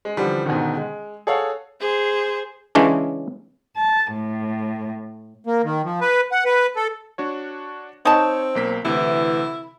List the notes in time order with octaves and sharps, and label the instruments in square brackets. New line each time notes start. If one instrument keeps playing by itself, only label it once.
[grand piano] G#3
D3 E3 F3 G3
G#2 B2 D3 D#3
G#3
G#4 A4 C#5 F5 F#5
[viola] G#4 C5
[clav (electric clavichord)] C#3 E3 G#3 C#4 D4
[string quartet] A5
A2
[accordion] A#3
D#3
F3
B4
F#5
B4
A4
[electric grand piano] D4 F#4 C#5
[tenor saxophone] C4 [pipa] D#4 A5 [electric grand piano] C#5
[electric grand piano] B1 A#3 B6
[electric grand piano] D2 C3 [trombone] E3 [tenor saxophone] E4